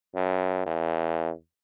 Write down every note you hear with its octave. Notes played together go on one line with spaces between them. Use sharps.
F#2
E2